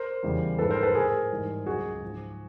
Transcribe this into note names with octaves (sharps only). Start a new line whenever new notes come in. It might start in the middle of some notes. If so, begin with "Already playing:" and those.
Already playing: A#4 C5
E2 C#3 E3 G3
G#2 F3 A4 B4
A#4 C5
A4 B4
A2 F3 G#4 A#4
G#2 E3 G3
C#2 C#3 F#3 F#4 G#4
G#2 F3